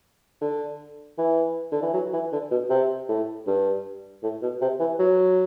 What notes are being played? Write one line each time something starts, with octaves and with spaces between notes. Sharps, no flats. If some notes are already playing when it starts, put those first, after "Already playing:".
D3
E3
D3
E3
F#3
E3
D3
B2
C3
A2
G2
A2
B2
C3
E3
F#3